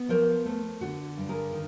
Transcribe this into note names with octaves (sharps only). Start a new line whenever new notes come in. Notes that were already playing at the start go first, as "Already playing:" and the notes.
Already playing: B3
F3 A#4 C5
A3
D3 F#4
G2
G#4 A#4
D#3